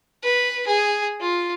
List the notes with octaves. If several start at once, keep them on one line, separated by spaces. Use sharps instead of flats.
B4
G#4
F4